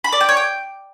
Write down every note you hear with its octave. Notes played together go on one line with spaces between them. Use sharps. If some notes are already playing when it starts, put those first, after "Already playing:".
B5
D5
G5
C#5
G5